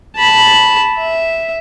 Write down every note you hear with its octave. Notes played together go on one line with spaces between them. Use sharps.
A5 B5
E5